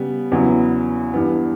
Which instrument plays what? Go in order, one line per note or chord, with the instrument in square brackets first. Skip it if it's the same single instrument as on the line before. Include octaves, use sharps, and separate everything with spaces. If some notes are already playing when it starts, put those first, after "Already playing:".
Already playing: [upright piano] C#3 G3 B3
E2 C#3 F#3 B3 E4
G2 E3 B3 D4